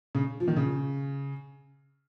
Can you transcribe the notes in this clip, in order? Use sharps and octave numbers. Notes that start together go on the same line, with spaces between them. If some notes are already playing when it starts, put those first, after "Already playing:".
C#3
F3
D#3
C#3